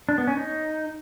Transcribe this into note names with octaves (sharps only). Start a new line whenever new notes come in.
D4
B3
C#4
D#4